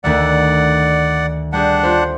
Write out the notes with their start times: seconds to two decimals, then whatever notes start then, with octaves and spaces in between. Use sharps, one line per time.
0.04 D2 D#3 A3 D5 F#5
1.53 G3 D4 G4 G#4 F#5
1.83 F4 G4 C5